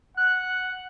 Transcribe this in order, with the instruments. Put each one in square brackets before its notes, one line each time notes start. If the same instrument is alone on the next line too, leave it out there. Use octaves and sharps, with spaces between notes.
[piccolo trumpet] F#5 [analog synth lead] F#6